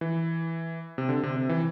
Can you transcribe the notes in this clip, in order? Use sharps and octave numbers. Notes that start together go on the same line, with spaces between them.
E3
C3
D3
C3
C3
E3